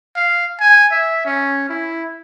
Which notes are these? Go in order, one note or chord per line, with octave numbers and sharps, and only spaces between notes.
F5
G#5
E5
C#4
E4